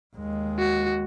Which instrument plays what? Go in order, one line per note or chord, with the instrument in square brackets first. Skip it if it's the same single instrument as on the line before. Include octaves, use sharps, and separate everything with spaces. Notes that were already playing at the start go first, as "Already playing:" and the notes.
[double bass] D#2 G#3
[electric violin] F#4